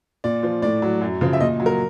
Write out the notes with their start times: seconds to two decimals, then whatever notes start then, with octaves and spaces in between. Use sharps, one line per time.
0.24 A#2 D5
0.43 F3
0.62 A2 D5
0.82 F#3
1.01 F#2
1.21 C#3 F3
1.33 E5
1.40 A#2 D#5
1.60 F#3
1.66 A#4